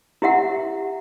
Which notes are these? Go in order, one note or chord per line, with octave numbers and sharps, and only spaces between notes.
E4 G4 E5 F#5